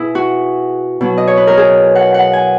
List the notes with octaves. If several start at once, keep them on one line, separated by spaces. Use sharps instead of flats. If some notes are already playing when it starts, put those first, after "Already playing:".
Already playing: B2 E4 G#4
F#4
B2 F#3
D#5
C#5
B4
A#4
G#4
F#5
F#5
G#5